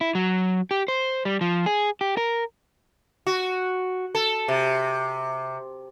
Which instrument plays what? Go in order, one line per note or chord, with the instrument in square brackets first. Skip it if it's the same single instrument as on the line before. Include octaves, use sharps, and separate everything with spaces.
[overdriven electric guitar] E4
F#3
G4
C5
G3
F3
G#4
G4
A#4
[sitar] F#4
A4
C3